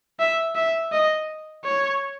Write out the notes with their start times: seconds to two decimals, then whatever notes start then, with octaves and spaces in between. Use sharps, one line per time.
0.20 E5
0.55 E5
0.92 D#5
1.65 C#5